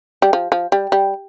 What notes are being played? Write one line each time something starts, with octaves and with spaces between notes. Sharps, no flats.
G3
F3
F3
G3
G3